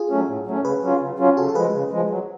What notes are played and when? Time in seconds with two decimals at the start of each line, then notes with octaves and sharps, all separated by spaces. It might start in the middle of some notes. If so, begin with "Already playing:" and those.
Already playing: F4 G#4
0.10 F#3 A3 C#4
0.28 A2
0.46 F#3 A3 C#4
0.64 C#3 G#4 B4
0.82 F#3 C#4 F4
1.01 C#3
1.19 F#3 C#4 F4
1.37 C#3 F#4 A4
1.49 A4
1.55 F3 G#3 G#4 B4
1.74 C#3
1.91 F3 G#3
2.10 F#3